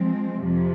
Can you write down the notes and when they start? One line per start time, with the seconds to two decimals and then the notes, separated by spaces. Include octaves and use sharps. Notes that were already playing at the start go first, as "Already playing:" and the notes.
Already playing: F3 G#3 C4
0.43 F2 C3 F3